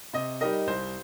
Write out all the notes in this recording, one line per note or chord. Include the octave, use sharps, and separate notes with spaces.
C3 D#5
G3 D#4 G4 A#4 D#5
C2 C5